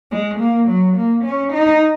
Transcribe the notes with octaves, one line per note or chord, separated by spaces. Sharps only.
G#3
A#3
F#3
A#3
C#4
D#4